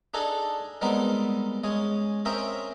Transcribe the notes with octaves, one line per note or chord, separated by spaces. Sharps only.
D4 D#4 G#4 A4 D#5
G3 G#3 B3 C4 D#4 A#4
G#3 C#4 G#4
C4 C#4 A#4 D#5 E5 G5